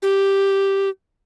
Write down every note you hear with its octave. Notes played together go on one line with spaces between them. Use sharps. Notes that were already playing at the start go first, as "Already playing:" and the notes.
G4